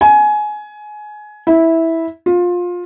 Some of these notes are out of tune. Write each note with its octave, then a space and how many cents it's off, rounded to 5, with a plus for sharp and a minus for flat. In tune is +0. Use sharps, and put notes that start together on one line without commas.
G#5 +20
E4 -10
F4 +20